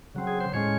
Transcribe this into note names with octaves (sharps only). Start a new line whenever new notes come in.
C#3 F#3 C4
G#4
C5
A2 G#3 C#4 C#5